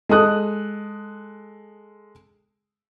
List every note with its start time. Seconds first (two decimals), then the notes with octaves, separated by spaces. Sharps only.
0.09 G#3 A4 D#6 F#6